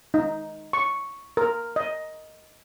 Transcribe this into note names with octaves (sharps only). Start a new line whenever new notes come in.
D#4
C#6
A#4
D#5